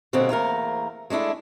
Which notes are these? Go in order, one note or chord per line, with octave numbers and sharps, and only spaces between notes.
B2 D3 G3 A#3 C4 C#4
E2 A3 A#3 A#4
G#3 A3 D4 E4